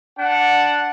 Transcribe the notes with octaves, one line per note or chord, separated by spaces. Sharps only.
D4 F#5